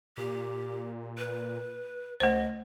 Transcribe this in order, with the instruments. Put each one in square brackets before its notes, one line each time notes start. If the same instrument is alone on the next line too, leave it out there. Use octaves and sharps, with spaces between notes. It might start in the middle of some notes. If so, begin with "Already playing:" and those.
[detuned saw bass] A#2 [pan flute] G4
[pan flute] B4
[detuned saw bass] C#2 [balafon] A3 C5 [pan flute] D#5